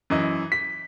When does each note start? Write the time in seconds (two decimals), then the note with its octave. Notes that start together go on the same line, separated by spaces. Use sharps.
0.10 F#2 E3 D#5
0.52 B6